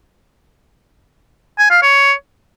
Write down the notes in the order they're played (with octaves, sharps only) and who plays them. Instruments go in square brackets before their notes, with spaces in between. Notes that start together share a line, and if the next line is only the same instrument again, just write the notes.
[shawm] G#5
F5
C#5